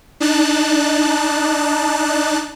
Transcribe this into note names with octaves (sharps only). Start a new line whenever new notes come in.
D4 D#4 A5 F#6